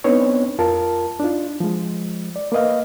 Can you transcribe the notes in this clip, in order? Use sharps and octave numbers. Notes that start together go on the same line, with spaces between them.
B3 C4 D4 D#4 B4 C#5
F2 F4 A#4 A5
D4 D#4 F4
F3 G#3
D5
A#3 B4 D#5 F5